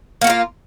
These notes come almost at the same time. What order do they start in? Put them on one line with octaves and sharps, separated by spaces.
A#3 F#4 A#4 F4